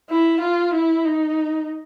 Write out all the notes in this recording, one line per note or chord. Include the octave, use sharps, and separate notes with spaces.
E4
F4
E4
D#4